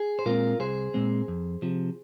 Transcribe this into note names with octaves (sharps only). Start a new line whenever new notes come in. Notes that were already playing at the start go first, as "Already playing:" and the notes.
Already playing: G#4
C5
A#2 G#3 C4 F4 A#4
C2 G#4 C5
A#2 G#3 C4
F2
C3 F3